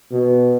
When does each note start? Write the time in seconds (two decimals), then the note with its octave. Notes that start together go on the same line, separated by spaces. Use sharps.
0.12 B2